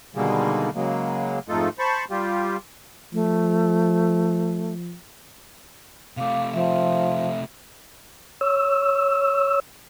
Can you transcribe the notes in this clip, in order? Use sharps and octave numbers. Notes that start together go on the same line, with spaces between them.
B2 D3 D#3 G3 G#3 A#3
C#3 F#3 G#3 A#3
F2 G#2 A3 D#4 F4 A4
C5 A5 B5 C#6
G3 F4 G4
F3 A3
C3 A3 F5 D6
F3 E5
C#5 E6